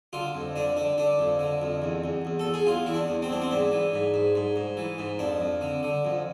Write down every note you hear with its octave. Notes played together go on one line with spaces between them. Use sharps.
D3 F4
F2
D3 D4
D3 D4
D3 D4
F2
D3
F2
E2
E2
E2
A4
E2
G#4
E2 F4
E2 E4
D4
E2
C4
E2 D4
C4
G#2 D4
E3
G#2
G#2
G#2
G#2
E3
G#2
F2 D4
F2
D3
D3
F2